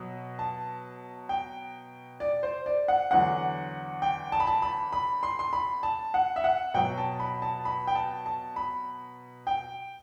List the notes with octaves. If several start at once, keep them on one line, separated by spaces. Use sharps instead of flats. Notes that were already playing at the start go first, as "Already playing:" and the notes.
Already playing: B2 F#3
A5
G5
D5
C5
D5
F#5
E2 D3 F#3 F#5
G5
A5
B5
A5
B5
B5
C6
C6
B5
A5
F#5
E5
F#5
B2 F#3 G5
A5
B5
A5
B5
G5
A5
A5
B5
G5